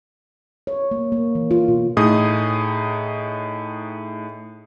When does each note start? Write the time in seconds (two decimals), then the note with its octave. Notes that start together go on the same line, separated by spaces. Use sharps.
0.67 C#5
0.91 A#3
1.12 A#3
1.35 E3
1.51 F4
1.68 B2
1.97 A2 D#4 G#4 D#6